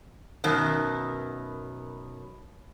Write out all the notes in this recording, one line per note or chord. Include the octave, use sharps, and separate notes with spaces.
F#2 B2 D#3